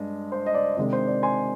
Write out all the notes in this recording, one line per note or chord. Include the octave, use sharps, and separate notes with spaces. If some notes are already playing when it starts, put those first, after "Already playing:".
Already playing: G2 G#3
C5
D#5
D5
C3 D#3 G#3 D4 D5
C5
D5
G#5 C6